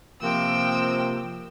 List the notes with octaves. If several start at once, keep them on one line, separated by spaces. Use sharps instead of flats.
C3 F3 A#3 G5 E6